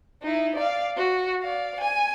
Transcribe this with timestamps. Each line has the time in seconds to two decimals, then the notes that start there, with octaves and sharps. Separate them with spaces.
0.23 D#4 E4
0.56 D5 F5
0.97 F#4
1.42 D5 F5
1.80 G#5